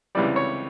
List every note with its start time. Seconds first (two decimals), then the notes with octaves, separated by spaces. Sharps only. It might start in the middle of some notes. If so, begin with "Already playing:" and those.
0.15 C#2 C3 E3 G3 D5
0.36 C#5